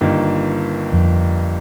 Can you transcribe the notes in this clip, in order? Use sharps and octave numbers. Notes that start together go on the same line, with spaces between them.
G1 G2 D#3 A#3
F2